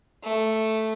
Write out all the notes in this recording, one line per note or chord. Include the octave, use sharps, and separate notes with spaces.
A3